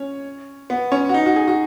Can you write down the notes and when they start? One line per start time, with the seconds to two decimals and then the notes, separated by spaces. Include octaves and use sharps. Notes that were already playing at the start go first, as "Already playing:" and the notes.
Already playing: C#4 C#5
0.70 B3
0.92 C#4
1.09 F#4
1.14 D#4
1.26 F#4
1.36 G#4
1.47 F#4